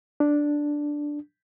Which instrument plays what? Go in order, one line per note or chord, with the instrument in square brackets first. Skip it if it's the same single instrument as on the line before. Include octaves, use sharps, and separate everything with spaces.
[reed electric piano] D4